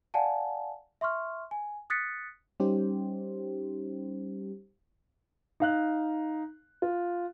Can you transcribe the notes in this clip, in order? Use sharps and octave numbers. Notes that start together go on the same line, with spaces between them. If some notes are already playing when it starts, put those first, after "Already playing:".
D5 F5 F#5 G#5 A5
E5 C6 C#6 F6
G#5
D#6 F#6 A6 B6 C#7
G3 C#4 D#4 G4 C5
D#4 F5 F#6
F4